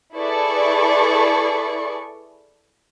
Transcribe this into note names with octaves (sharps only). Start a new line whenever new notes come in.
E4 G#4 A4 B4 D5 C#6